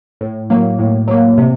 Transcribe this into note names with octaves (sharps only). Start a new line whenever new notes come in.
A2
F#3 A#3
A2
F#3 A#3
C3